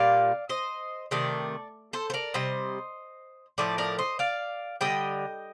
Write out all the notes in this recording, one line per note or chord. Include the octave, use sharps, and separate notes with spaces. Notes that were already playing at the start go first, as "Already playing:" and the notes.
Already playing: A#2 G3 D5 F5
C5 D#5
C3 D#3 A3 D5
A4 C5
C5
A#4 D5
C3 G3 C5 D#5
A2 F3 A3 D5
A#4 D5
C5 D#5
D5 F5
D3 G3 D#5 G5